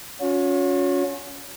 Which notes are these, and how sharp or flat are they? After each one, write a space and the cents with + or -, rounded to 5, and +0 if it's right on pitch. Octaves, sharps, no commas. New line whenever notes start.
C#4 +20 F#4 -45